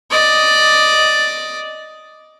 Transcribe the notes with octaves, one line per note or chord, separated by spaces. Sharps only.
D5 D#5